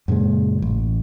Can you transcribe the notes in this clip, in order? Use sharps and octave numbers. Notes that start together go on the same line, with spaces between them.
F#2 A#2 C#3 G#3
A1